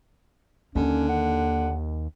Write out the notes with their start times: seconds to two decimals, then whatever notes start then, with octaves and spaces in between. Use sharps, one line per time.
0.76 D#2 D3 A#3 C#4
1.09 F#5